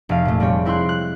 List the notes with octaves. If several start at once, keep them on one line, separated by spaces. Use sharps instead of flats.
F1 F5
A#2 A3
G3 G#3 C4 C#5
C4 E4 G5 C6 F#6
F#6